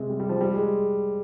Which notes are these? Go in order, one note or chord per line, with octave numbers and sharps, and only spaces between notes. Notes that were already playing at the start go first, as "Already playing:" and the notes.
Already playing: C3 G#3
G3
G3
F3
G3
G#3